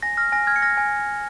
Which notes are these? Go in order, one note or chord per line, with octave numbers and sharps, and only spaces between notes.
G#5 A#6
F6 A#6
G#5 A#6
F6 G#6
C#7
F6 A#6
G#5